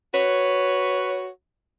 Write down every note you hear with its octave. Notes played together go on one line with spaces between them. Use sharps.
F#4 B4 C#5